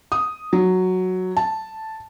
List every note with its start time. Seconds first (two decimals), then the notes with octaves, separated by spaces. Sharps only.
0.12 D#6
0.53 F#3
1.37 A5